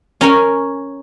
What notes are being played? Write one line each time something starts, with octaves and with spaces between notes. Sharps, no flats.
C#4 A#4 C#5 G#5